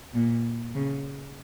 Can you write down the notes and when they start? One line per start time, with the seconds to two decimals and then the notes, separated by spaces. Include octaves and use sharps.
0.13 A#2
0.75 C#3